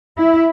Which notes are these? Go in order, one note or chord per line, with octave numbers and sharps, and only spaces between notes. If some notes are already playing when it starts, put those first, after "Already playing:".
E4